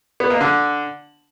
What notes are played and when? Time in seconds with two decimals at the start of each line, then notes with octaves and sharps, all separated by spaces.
0.20 B3
0.30 A#3
0.41 D3